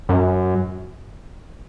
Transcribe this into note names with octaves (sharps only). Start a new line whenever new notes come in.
F#2